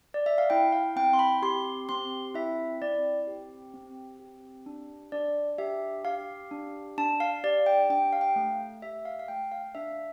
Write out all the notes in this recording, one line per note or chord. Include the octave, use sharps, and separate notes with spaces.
D5
E5
F5
E4 G5
F5
C4 G5
C6
B5
G4 C6
C4 C6
E4 E5
C4 D5
G4
C4
G4
D4
D4 D5
G4 E5
G4 F5
D4
D4 A5
F5
G4 D5
G5
D4 G5
F5
G5
A3
G4 E5
F5
F5
A3 G5
F5
D4 E5